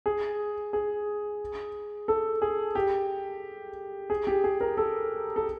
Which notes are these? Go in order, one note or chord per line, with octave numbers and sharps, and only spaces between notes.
G#4
G#4
A4
G#4
G4
G#4
G4
G#4
A#4
A4
A4